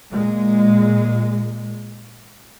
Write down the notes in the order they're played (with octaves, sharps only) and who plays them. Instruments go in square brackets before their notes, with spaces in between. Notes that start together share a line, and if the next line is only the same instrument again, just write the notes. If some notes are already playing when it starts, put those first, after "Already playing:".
[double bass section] A#2 G#3